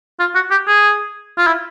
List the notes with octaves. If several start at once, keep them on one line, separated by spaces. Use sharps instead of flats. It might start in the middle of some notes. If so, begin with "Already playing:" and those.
F4
F#4
G4
G#4
F4
E4